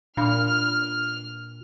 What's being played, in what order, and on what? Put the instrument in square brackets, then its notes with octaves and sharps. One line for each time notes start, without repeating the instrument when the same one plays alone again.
[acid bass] A#2 [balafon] D4 F5 B5 [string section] F6